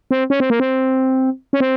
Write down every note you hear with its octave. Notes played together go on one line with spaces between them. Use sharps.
C4
C#4
C4
A#3
C4
C#4
C4